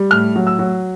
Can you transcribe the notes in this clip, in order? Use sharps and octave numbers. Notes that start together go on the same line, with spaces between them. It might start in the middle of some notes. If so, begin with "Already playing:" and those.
Already playing: G3
A2 F6
F#3
E6
F#3